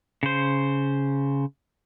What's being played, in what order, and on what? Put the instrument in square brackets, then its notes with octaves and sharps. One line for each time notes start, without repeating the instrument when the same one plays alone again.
[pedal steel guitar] C#3 C5